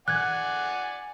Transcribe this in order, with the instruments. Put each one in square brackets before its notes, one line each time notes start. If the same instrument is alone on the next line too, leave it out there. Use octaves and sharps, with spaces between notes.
[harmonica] D5 F#5 G#5 [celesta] F#6 G#6